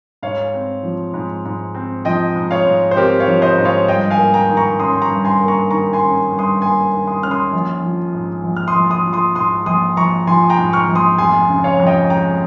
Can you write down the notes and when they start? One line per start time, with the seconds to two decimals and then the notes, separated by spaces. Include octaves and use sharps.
0.23 G#2 C#5 F5
0.54 C4
0.83 F3
1.14 G#2
1.45 G#2
1.75 C4
2.05 F3 D#5 G5
2.36 G#2
2.51 C#5 F5
2.66 G#2
2.91 C5
2.96 C4 G4 A#4
3.20 C#5 F5
3.28 F3
3.42 C5 D#5
3.58 G#2
3.65 C#5 F5
3.88 G2 D#5 G5
4.10 F5 G#5
4.18 A#3
4.34 G5 A#5
4.50 D#3
4.57 A#5 C#6
4.79 C#4 C6 D#6
4.92 C6
5.02 A#5 C#6
5.09 G2
5.25 G#5 C6
5.40 A#3
5.48 A#5 C#6
5.71 D#3 A#5 C#6
5.93 G#5 C6
6.01 C#4
6.32 G2
6.39 C6 D#6
6.62 A#3 G#5 C6
6.93 D#3
7.07 C6 D#6
7.23 C#4 F6
7.31 C6 D#6
7.53 A#1
7.83 F3
8.14 G#2
8.44 A#1
8.57 F6
8.68 C6 D#6
8.76 A#1
8.90 C6 D#6
9.05 F3
9.13 C6 D#6
9.35 G#2 C6 D#6
9.66 A#1 C6 D#6
9.97 A#1 A#5 C#6
10.27 F3 G#5 C6
10.50 G5 A#5
10.58 G#2
10.73 C#6 F6
10.89 A#1
10.95 C6 D#6
11.18 F1 G#5 C6
11.49 C#3
11.64 C#5 F5
11.80 F2
11.87 D#5 G5
12.10 G#3 G5 A#5